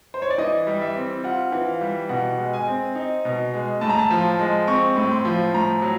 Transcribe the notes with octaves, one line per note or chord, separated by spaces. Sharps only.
C5
C#5
D5
E3 D#5
G3
E5
C4
F4 F#5
E3
F5
G3
B2 F#5
G#3
G#5
C4
D#4
B2
G#3
A2 A5
A#5
A5
F3
G#3
C4 C#6
A2
C6
F3
A2 A#5
F#3